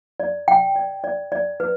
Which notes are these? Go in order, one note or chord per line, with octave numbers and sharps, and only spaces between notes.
D5
G5
D5
D5
D5
B4